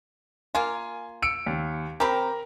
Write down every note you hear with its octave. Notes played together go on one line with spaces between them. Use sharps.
A#3 F4 G#5
E6 C#7 D7
D#2
C4 G4 A#4 A#5 B5